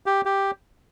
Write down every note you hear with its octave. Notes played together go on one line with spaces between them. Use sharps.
G4
G4